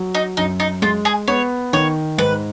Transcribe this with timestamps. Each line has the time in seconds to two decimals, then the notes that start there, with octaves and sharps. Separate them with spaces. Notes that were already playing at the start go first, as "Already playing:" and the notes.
Already playing: F#3
0.15 D#4
0.37 F#2 D#4
0.60 D#4
0.82 G#3 F4
1.05 G#4
1.28 B3 C#5
1.73 D#3 C#5
2.18 G#2 B4